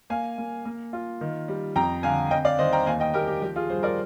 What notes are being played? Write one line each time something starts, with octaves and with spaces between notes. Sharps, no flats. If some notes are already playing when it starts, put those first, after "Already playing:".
A#3 F5 G#5
A#3
A#3
F4
D#3
G3
F2 G5 A#5
D3 F5 G#5
C4 D#5 G5
D5 F5
D#3 C5 D#5
G5 A#5
D#2 F5 G#5
D#5 G5
D#2 G4 A#4
G4
F3 G4
F4 G#4
G2 G#4 C5
A#4 D5